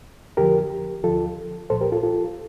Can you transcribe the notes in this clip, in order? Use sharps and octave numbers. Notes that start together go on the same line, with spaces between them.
F2 D3 F3 G4 A#4
D2 D3 F3 F4 A4
C2 A#2 F3 A4 C5
G4 A#4
F4 A4
F4 A4